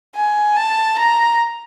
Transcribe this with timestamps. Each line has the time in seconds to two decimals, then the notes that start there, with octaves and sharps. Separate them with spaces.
0.16 G#5
0.57 A5
0.99 A#5